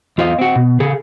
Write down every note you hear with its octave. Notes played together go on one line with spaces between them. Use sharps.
E2 F4 C5 D#5 F5
C4 F#4
B2
C#3 G#4 A4